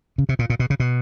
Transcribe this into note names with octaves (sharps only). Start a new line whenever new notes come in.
C#3
C3
A#2
A#2
B2
C#3
B2